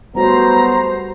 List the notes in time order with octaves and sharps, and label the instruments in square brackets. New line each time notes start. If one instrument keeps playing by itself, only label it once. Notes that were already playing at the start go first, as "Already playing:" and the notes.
[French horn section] F#3 A3 B3 [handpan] G3 F#4 [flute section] C5 [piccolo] A#5